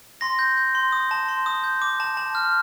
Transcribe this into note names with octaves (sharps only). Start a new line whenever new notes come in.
C6 A#6
G6
G6
C6
D#6
A5
C6
D#6
G6
D6
A5
A5
F6